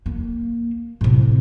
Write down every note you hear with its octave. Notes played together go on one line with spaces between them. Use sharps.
A#3
A2 C3